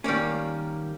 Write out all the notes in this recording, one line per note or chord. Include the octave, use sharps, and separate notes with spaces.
D#3 G3 A#3 C#4